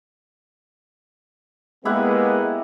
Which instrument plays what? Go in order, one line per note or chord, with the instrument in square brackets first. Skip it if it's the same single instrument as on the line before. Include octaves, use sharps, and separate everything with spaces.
[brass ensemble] G#3 A#3 B3 [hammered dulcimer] E4 G4 F#5